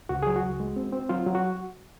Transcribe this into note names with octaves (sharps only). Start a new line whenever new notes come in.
C#2 F#4
F#3 G#4
F#4
C#2
G#3
C4
C4
F#3 F4
F#3
F#4